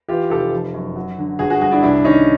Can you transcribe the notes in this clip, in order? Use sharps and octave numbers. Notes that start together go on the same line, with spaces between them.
E3 F4 G4
F1 G4 A4
F3
F#2
F#3
D3
G1 F#4 G#4
F#4 G#4
G2 F#4 G#4
D4 E4
C2 D4 E4
D#3 C#4 D#4